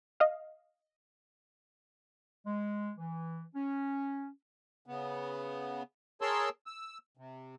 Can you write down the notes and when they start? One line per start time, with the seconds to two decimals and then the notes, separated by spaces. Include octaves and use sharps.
0.20 D#5 F5
2.46 G#3
2.97 E3
3.54 C#4
4.86 C#3 B3
6.21 G#4 A#4 C#5 A5 C6 E6
6.67 E6
7.17 C3